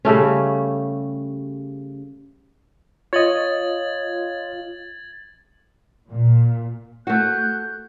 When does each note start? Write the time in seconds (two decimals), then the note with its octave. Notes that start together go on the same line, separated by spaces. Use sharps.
0.05 C#3 G3 A3 C#4
3.13 F4 C#5 D#5 G#6 A6 F#7
6.09 A#2
7.07 A3 F#4 F#6 G6